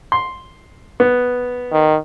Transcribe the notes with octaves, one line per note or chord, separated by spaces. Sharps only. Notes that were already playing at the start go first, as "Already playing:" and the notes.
C6
B3
D#3